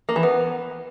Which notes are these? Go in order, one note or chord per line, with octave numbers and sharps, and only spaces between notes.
A#3
E3
B3